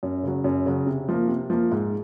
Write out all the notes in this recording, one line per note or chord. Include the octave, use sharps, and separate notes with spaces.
F#2
C#3 F#3
F#2
C#3 F#3
C3
F3 A#3
C3
F3 A#3
G#2